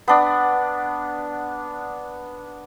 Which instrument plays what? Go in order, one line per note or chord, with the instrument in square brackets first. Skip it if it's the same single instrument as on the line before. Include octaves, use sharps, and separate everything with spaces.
[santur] B3 D4